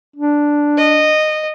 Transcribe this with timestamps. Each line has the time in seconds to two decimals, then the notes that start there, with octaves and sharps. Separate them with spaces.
0.16 D4
0.77 D#5